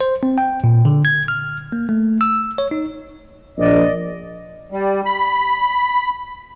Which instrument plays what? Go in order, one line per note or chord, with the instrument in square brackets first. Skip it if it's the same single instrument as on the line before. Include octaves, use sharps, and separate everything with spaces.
[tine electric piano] C5
C4
G5
A#2
D3
G#6
F6
A#3
A3
E6
C#5
D#4
[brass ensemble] A#1 [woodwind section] D5 D#5
[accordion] G3
B5